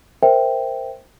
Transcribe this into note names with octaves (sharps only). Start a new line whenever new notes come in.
A#4 C5 E5 G5